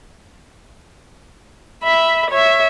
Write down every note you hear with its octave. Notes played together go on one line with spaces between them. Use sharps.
E5 B5
C#5 E5